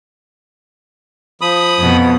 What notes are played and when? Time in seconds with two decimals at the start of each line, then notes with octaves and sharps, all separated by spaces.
1.41 F3 B5 D#6
1.78 F2 B2